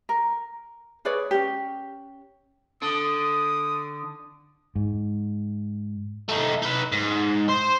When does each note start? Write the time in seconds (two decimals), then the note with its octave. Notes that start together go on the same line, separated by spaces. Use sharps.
0.09 A#4
1.05 G#4 B4 C#5 D5
1.31 C#4 G4
2.83 D3 D#6
4.76 G#2
6.29 A3 D#4
6.62 D#4 B4
6.92 G#2
7.49 C5